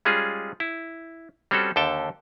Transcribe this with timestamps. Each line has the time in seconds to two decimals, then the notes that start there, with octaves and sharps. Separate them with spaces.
0.05 G3 G#3 C#4 F4 G#4
0.60 E4
1.51 G3 C4 C#4 F#4 A4
1.76 D#2 D3 A4 G5 A5